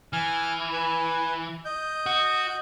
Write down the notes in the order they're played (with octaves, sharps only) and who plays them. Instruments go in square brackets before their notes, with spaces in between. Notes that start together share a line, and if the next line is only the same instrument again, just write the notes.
[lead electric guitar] E3 [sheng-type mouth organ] G#5 F6
[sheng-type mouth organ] B4 G#5
D#5 G6
[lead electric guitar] F#4